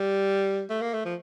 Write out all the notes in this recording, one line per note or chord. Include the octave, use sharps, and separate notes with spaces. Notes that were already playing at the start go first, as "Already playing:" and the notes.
Already playing: G3
A3
A#3
A3
F3